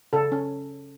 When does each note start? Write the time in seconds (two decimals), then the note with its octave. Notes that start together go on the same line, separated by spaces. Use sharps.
0.13 C#3 A4
0.32 C#4